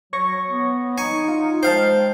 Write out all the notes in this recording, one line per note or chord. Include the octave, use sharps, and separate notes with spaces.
F#3 C#5 C#6 A#6
B3
D#4 G#5 C#6 C#7
F4
G#3 C5 F5 G5 A5